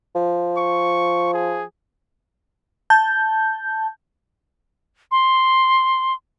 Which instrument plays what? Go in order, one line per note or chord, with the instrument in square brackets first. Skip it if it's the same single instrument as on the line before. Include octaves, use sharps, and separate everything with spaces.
[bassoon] F3
[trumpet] C#6
G#4
[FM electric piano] A5 G6
[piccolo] C6